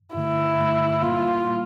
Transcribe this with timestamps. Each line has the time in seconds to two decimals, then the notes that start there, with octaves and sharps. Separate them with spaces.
0.14 G2 D3 A3 E4
0.58 G2 D3 A3
1.02 A#2 G3 A#3 F4
1.46 A#2 G3 A#3